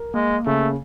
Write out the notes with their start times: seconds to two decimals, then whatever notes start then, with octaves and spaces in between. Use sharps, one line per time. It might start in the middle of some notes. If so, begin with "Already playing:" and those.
Already playing: A#4
0.14 G#3 A#3
0.46 C#3 A3